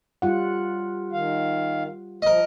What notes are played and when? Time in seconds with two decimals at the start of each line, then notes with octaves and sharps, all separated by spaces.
0.22 G3 F4 F#5
1.12 D#3 F5
2.22 F3 A#4 D#5